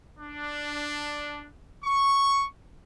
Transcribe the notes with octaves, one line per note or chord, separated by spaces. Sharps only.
D4
C#6